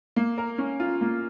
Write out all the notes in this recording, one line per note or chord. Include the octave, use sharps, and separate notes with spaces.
A#3
A#4
C#4
F4
A#3